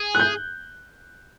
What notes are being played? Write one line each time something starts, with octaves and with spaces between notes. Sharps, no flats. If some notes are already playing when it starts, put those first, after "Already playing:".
Already playing: G#4
F#6
G6